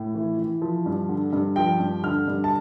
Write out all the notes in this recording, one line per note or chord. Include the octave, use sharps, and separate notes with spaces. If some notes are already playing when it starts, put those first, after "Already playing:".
Already playing: A2
E3
E3
F3
G2
D3
G2
F3 G5
G2
D3 F6
G2
A5